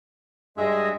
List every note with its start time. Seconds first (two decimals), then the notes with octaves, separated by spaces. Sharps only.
0.58 G2 G#3 G#4 D#5 E5